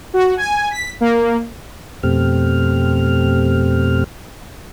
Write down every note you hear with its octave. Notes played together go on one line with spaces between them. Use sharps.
F#4
G#5
B6
A#3
F2 B2 A3 C4 G4 F6